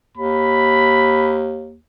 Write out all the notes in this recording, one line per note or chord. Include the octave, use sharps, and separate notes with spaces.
D#2 B5